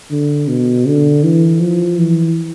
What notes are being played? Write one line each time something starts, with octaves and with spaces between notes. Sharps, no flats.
D3
B2
D3
E3
F3
E3